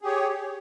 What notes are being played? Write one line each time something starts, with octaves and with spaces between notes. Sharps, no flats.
G4 G#4 C#5